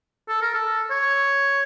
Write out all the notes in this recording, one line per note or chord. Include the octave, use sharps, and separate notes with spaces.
A4
A#4
A4
C#5